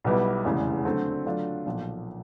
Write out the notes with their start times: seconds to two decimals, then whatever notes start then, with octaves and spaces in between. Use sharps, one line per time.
0.04 B1 B2 G3 B3 E4
0.44 F1 E2 C#3 E3 G#3
0.85 D3 F#3 A3 C4
1.26 D3 F#3 A3 D4 F4
1.66 B1 A#2 F3